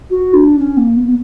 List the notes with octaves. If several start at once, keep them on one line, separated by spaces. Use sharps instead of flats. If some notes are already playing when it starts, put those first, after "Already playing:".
F#4
D4
C#4
A#3
B3
B3